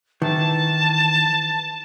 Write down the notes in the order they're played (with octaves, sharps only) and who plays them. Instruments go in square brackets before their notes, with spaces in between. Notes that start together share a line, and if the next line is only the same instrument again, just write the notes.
[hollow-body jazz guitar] D#3 E3 [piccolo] A5